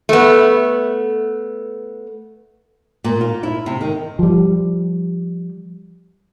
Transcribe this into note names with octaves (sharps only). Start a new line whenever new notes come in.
A3 B3
A#2
F4
E4
C3
D#3
F3 G3